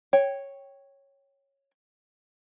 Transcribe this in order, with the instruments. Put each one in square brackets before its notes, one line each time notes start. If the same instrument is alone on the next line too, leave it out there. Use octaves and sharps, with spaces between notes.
[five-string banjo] C#5 G5